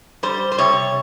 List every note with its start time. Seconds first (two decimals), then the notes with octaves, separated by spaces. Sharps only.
0.23 G3 C5
0.52 C5
0.58 C3 C#5